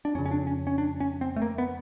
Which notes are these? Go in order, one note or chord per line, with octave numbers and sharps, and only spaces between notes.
D4
F2 C#3 C#4
C#4
D4
C#4
C#4
D4
C#4
C4
A3
A#3
B3